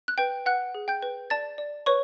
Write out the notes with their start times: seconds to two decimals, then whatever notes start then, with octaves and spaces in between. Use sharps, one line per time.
0.08 F#6
0.18 B4 G5 G6
0.46 B4 F#5 F#6
0.75 G#4
0.88 G5 G6
1.03 B4
1.30 D5 A5 A6
1.58 D5
1.86 B4 C#5 C#6